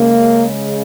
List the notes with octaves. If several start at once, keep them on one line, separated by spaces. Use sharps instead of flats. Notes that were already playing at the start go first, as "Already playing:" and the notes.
Already playing: C#3 G#3 A#3